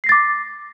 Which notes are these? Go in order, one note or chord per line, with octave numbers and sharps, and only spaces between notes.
D6 A6 A#6 C7